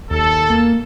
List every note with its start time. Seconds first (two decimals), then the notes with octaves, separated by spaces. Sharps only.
0.11 D#2 A4
0.50 A#3